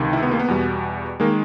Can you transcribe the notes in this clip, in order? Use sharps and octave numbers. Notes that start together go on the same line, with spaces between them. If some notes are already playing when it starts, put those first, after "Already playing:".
Already playing: C#2 C3 D#3
E4
B3
A#3
B3
E2 B2 G3
D#3 G#3 A#3